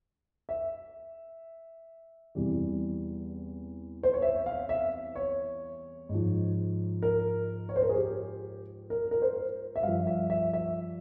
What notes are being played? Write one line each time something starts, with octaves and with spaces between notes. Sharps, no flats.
E5
E2 C3 E3 G3
C5
C#5
E5
F5
E5
C#5
G#2 F3
A#4
C#5
C5
A#4
G#4
G4
A#4
A#4
C5
E5
G2 F3 F5
E5
E5
E5